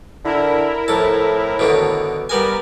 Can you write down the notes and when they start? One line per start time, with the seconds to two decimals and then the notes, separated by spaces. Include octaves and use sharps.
0.25 D3 E4 A#4
0.88 F2 A2 A4
1.59 B2 D3 D#3
2.29 G3 B3 A#4 G#5